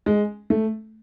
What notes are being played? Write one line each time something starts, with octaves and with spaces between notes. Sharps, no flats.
G#3
A3